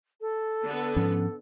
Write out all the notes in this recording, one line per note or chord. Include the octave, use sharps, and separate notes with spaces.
A4
D3 B3
G#2 F3 C#4